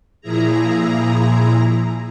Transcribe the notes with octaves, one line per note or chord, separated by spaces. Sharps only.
A#2 F3 E4 G#4 A#5